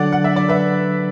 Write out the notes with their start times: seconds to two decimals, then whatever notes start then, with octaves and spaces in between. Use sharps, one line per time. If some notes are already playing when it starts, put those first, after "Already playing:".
Already playing: D3 F#3 D4 A4 D5 F#5
0.12 F#5
0.24 E5
0.36 D5
0.49 B4 E5